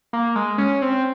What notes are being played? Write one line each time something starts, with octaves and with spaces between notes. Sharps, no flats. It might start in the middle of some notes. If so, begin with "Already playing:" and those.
A#3
G#3
C#4
C4